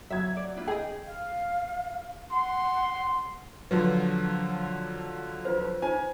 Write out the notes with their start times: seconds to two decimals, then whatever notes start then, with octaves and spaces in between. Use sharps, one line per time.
0.10 F#3 E5 G#6
0.37 D5
0.56 D4 E4 F4
0.68 G#4 D#5 G5
1.06 F5
2.31 F#5 C6
3.71 D3 F3 F#3 B4
5.45 F4 B4 C5
5.82 D#4 F4 C5 G#5